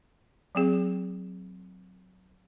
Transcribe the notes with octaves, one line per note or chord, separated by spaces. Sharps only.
F#3 C4 G#4